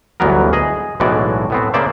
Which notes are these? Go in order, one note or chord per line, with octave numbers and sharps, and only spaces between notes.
G1 D2 E3 F#3 B3 A#4
G#4 D#5
B1 A2 E3 G#3 F#4 D5
A2 B3 C4
C#3 A#3 C5 D5 E5